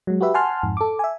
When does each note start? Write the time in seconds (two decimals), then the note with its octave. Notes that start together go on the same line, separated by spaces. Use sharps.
0.07 F#3 G#3
0.21 F#4 G4 B4 E5
0.34 F#5 G#5 A5 C6 F6
0.63 F2 G#2
0.77 A4 D6
0.99 E5 G#5